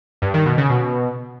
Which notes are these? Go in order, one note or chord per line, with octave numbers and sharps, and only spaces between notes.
G2
D#3
B2
C#3
B2